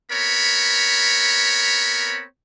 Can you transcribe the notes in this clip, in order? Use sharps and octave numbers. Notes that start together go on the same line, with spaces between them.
B3 C4 A#4 C#5 B5